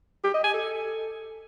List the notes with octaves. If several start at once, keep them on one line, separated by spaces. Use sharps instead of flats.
G4
D#5
G#5
A4